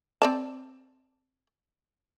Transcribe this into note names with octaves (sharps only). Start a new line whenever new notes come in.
C4 D5 A5